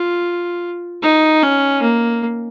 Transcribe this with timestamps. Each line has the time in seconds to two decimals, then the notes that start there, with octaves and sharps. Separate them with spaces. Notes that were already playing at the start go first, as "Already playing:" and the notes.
Already playing: F4
1.02 D#4
1.43 C#4
1.82 A#3